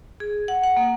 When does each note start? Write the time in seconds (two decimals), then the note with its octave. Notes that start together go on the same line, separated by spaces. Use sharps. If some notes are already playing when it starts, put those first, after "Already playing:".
0.20 G#4
0.48 F#5
0.64 F#5
0.77 A#3